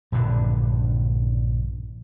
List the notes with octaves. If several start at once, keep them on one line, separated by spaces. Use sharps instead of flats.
A#1 G2 D3